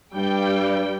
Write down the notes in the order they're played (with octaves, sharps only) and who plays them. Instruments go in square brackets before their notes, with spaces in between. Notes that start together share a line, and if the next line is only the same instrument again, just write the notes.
[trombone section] G2 [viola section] G3 G5